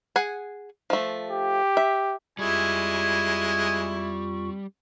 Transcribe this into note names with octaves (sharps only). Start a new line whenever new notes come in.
G#4 F#5 G#5
F3 A3
G4
E5
F2 G3 G#3 E4 F4 G#5 C#6